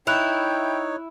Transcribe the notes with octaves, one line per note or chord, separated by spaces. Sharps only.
D#4 E4 C#5 G5 F#6 F7